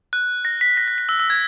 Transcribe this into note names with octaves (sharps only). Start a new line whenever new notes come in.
F#6
A#6
B6
A#6
A#6
B6
E6
E6
G#6